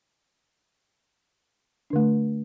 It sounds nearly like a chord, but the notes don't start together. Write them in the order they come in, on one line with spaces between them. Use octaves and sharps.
D4 D3 A3